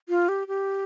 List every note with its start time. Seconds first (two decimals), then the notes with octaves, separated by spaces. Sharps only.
0.09 F4
0.29 G4
0.48 G4